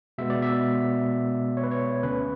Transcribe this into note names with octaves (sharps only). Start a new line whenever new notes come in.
B2 G#3 B3 E5
D5
E5
C#5
B4
C#5
D2 D3 A3 C#4 B4